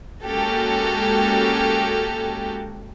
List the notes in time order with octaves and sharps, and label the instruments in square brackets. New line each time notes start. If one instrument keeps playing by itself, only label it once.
[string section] G#3 A#3 C#4 F#4 G4 A4